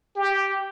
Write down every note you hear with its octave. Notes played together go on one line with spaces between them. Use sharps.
G4